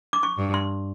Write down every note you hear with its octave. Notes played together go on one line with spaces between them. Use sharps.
D6
C#6
G2
C6